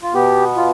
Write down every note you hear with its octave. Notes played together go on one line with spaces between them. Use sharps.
F4
B2 B3 G4
F4